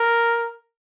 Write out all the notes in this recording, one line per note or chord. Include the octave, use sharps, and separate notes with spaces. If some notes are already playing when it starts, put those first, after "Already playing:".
Already playing: A#4